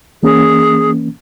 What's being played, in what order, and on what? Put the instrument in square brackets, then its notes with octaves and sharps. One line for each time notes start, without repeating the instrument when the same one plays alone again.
[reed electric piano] E3 A#3 C#4 [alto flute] G#4